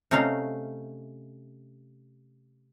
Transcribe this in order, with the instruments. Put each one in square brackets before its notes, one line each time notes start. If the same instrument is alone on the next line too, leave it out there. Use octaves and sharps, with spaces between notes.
[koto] C3 A3 C#4 D#4 F5